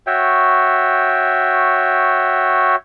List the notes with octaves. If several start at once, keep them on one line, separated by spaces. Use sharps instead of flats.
F#4 C#5 E5 G5